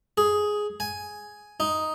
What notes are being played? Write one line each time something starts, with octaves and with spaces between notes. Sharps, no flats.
G#4
G#5
D#4